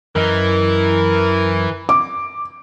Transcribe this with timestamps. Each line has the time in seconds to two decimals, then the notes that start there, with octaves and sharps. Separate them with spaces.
0.16 F#2 E3 A#4 D#5 A#5
1.89 D6